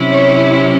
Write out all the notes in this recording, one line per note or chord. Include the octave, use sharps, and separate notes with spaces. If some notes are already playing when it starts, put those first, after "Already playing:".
Already playing: C3 F#3 C#4 E4
C#5